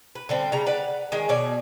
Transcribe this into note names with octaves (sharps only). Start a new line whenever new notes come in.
B4
D3 G3 C4
C#3 G3 A#5
B4 D5 F#5
D#3 G#3 G#4
B2 C#5 D5